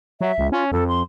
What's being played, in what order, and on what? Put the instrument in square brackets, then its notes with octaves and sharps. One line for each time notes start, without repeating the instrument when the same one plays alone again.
[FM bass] F#3 [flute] E5
[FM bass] C#2
[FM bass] C#4 [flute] F4
[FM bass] F2 [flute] A4
[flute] C6